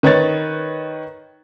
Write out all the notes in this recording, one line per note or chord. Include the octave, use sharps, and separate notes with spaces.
D#3 B4 C#5 A6